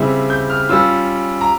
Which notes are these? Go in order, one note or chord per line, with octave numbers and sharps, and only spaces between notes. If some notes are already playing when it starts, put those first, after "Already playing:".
Already playing: C#3 G3 C4 E4
G6
F6
G3 C#4 F4 E6
A#5